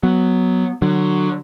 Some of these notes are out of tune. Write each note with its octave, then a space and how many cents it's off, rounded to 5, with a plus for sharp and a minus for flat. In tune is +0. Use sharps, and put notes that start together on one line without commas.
F#3 +0 B3 +0
D3 +25 F#3 +0